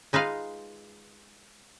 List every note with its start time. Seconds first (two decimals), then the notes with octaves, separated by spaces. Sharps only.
0.13 G#3 D#4 F4 B4 F5